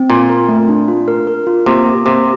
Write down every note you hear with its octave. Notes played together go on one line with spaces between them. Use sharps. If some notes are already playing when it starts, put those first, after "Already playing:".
Already playing: C4
A#2 F4
A#4
A3
D4
F4
A#4
A#4
F4
C3 A#3
A#3
C3 A#3